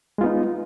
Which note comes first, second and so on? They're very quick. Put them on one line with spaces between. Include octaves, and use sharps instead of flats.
G#3 F4 B3 D#4